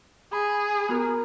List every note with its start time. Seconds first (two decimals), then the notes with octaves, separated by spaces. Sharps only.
0.33 G#4 B5
0.88 B3 F#4 A#4